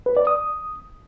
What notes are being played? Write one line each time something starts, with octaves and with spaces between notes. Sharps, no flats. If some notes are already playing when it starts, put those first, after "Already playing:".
B4
D5
D#6